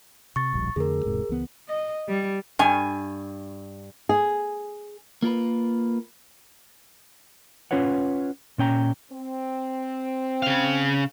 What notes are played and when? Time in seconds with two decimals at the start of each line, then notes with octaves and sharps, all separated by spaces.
0.36 C3 C#6 A6
0.53 D1 A#1 G3
0.76 F2 D3 A3 G#4 A#4
1.05 E1 G#2 C3
1.29 C#2 E3 B3
1.68 D#5
2.08 G3
2.59 G2 G#5
4.09 G#4
5.22 A#3 F4 A#4 B4
7.71 C#4 F4 B4 C#5 F#5
8.58 A#2 C#4 G5 A#5
9.11 C4
10.43 C#3 F5